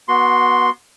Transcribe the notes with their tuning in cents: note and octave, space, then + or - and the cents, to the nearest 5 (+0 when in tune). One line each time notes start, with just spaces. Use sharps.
B3 -25 F#4 +0 C6 +0